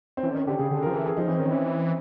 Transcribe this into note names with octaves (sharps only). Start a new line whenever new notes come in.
C4
E3 C#4
D3
D#3 C#4
D3 G4
C#3 G#4
D3
F3 A#4
E3 A4
G#4
F3 D#4
E3 C4
D#3 C#4
E3 C#4